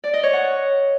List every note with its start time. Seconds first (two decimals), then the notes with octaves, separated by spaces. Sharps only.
0.04 D5
0.14 D#5
0.23 C#5
0.33 F#5